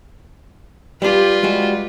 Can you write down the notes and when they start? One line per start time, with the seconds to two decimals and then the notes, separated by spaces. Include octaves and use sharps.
1.02 G3 F4 G4 B4
1.43 G3 G#3 F#4